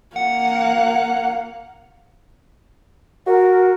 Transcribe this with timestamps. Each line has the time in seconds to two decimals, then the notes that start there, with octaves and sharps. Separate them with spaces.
0.16 A#3 F5 F#5
3.27 F#4 A#4